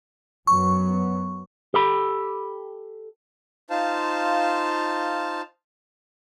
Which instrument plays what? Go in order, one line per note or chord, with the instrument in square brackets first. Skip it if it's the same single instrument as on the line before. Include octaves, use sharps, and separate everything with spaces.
[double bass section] F#2 F#3 B3 [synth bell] C#6
[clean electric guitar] G4 A4 B5
[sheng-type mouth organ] D#4 F4 C5 F5 A5